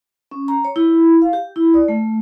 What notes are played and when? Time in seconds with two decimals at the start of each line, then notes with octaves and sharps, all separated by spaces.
0.31 C#4
0.48 A#5
0.65 C#5
0.76 E4
1.22 F5
1.33 G4
1.56 E4
1.74 D5
1.88 A3